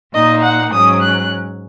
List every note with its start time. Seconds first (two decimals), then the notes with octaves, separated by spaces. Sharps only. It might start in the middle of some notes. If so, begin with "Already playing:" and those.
0.13 A#2 A#3 D#4 D#5
0.42 F#5
0.72 G#2 F#3 C#4 D#6
1.02 F#6